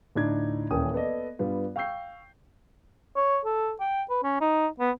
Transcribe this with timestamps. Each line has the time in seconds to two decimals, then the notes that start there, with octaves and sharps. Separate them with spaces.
0.15 D2 A2 D4 D#4 G#6
0.71 D#1 E3 C#4 A#4 G5 D#6
0.94 B3 A4 D5 D#5
1.39 G2 G3 B3 F4
1.76 F5 G5 C#6 E6 G6 C7
3.16 C#5
3.45 A4
3.80 G5
4.10 B4
4.24 C#4
4.41 D#4
4.79 B3